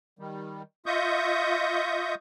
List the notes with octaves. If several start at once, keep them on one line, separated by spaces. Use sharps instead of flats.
D#3 G3
F4 D#5 E5 C#6 D#6 G6